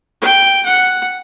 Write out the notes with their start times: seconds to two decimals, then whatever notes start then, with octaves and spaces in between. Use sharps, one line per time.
0.21 G5
0.65 F#5